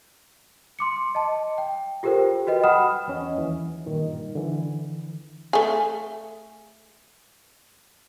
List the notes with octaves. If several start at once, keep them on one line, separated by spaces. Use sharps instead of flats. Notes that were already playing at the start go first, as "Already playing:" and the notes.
C6 D6 C#7
D#5 A5
G5
F4 G4 A4 A#4 C5 G5
F#4 B4 D#5 G5
F#5 G5 B5 D#6 F6 E7
E2 C#4 D#5
D#2 E3
G2 A#2 D#3
D3 E3
A3 G#4